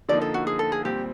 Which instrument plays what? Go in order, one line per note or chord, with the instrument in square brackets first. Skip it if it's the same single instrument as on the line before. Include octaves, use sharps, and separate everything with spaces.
[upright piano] D3 F3 A#3 D#4 [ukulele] D5
[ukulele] A4
F#4
G#4
A4
G#4
[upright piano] A#2 G3 C4 [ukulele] G4